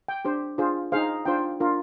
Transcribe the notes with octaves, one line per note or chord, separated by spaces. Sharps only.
G5
D4 G4 C5
D4 F4 G#4 C5
D#4 G#4 C5 F5
D4 F4 C5 G5
D4 F4 A#4